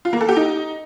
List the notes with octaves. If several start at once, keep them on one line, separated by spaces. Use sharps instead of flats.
F4
A#3
A4
G4
D#4